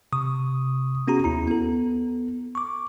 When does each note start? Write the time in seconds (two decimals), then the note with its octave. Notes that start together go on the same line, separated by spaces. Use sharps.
0.13 C3 C#6 D#6
1.07 B3 C#4 F#4 G#4 A#5
1.24 D#2 E4 A#5
1.48 B3 A4
2.55 C#6 D6